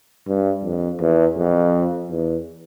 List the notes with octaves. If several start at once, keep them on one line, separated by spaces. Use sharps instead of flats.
G2
F2
E2
F2
E2